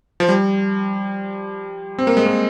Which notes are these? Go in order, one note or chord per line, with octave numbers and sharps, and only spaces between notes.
F3
G3
C4
A#3
G#3
A#3